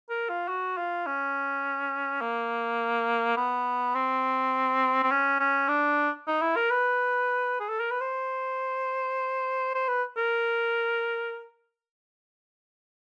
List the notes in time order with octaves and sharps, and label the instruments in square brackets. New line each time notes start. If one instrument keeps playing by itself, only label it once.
[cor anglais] A#4
F4
F#4
F4
C#4
A#3
B3
C4
C4
C#4
C#4
D4
D#4
E4
A#4
B4
G#4
A4
A#4
B4
C5
C5
B4
A#4